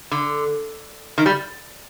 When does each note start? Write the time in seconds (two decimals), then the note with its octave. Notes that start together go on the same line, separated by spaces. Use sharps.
0.11 D3
1.18 D#3
1.26 G3